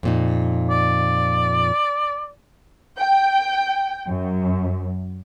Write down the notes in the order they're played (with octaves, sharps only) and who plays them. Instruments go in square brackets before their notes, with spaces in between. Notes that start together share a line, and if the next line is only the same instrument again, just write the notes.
[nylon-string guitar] F2 A#2 D#4
[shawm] D5
[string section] G5
F#2